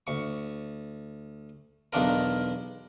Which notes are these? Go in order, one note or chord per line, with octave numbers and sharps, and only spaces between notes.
D2 C#6
B1 E2 D#3 D4 F4 A#4